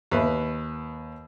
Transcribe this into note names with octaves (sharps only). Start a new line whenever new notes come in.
D#2 B4